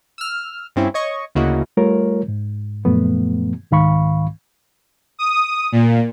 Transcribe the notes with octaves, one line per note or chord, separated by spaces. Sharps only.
E6 F6
G2 C4 C#4 E4
C#5 D#5 C#6
D2 C#3 A#3 E4 F#4 D#5
G3 A3 F4 A#4 C#5
G#2
F#2 A#2 F3 A3 B3
C2 G#2 D#3 F5 B5 C#6
D#6
A#2